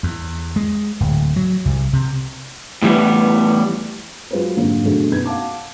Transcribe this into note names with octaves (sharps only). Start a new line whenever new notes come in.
E2
G#3
D1
F#3
C2
C3
A2 E3 G3 B3
F#3 G#3 F4 G4 B4 C5
F2 G#2 D3 F#3 A#3
B2 D3 F#3 G#3 A3 G#4
F#2 B2 D#4 B4 G#6
F5 F#5 A5 D6